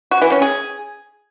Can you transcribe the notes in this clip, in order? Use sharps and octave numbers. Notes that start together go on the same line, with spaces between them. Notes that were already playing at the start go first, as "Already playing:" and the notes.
F#4
E3
C#4
G#4